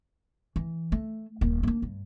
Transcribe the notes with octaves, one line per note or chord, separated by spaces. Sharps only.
E3
A3
D#1 A#3
A#3 D4
G2